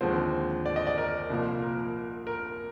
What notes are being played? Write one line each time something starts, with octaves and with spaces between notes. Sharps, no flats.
D#2 D3 F3 G#3 C4 C5
D5
D#5
D5
A#4
C2 A#2 F3 A#3
A#4
A#4